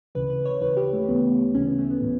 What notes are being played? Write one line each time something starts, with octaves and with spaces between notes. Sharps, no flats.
D2 C#3 E3 B4
B4
C#5
D2 C#3 E3 B4
G4
A3
D2 C#3 E3 B3
D2 C#3 E3 C#4
B3
A3
B3
A2 E3